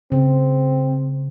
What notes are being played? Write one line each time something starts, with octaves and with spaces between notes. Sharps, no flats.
C#3 C4